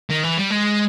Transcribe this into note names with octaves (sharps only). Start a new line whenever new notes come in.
D#3
E3
G3
G#3